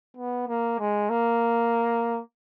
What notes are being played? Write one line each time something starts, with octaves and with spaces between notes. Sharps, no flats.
B3
A#3
G#3
A#3